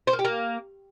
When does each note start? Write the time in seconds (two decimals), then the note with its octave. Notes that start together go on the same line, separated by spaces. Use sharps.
0.07 C5
0.13 A#3
0.19 G4
0.25 A#3